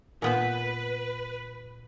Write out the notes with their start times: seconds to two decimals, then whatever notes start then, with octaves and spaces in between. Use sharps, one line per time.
0.22 A#2 B3 B4 C5